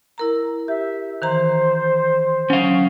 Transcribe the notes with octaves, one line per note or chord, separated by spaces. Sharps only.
E4 A#4 A#5
G4 E5
D#3 E3 C5 A#5
F#3 C#4 F5